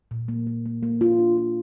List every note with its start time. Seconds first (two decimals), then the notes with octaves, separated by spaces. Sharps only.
0.11 A#2
0.28 A#3
0.47 A#3
0.66 A#3
0.83 A#3
1.01 F4
1.19 D4
1.37 F4